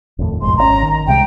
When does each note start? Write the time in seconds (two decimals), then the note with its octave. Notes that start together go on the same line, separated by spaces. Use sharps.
0.19 F1 D#2 A2
0.42 B1 F2 G#2 C6
0.57 G#1 D#3 C#4 A#5
0.83 D#3
1.07 C2 C3 G#3 G5